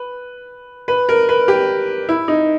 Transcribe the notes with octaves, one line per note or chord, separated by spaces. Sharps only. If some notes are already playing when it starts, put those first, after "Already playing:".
Already playing: B4
B4
A#4
B4
G4
E4
D#4